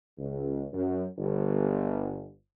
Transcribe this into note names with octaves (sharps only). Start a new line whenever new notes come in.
C#2
F#2
G1